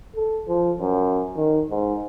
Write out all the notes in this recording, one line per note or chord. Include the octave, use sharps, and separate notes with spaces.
A4
F3
F#2
D#3
G#2